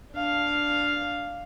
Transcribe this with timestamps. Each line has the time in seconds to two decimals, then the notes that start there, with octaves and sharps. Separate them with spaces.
0.12 D4 F5